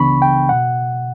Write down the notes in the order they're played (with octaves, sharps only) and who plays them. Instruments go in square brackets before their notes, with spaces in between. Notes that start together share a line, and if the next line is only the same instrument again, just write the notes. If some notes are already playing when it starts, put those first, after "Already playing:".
Already playing: [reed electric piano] C#2 C#3 E3 B3 D4 B5 C#6
G5
B2 F#5